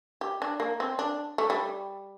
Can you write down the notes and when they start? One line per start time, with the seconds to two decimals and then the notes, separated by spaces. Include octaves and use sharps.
0.21 G4
0.42 D4
0.60 A#3
0.80 C4
0.99 D4
1.38 A3
1.50 G3